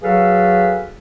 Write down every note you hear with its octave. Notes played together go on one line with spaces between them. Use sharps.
F#3 F#4 G#4 A4 B4 F5